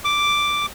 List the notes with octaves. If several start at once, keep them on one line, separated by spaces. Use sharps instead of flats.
D6